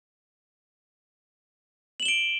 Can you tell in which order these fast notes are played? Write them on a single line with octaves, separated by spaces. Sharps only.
F#7 E7 G7 D7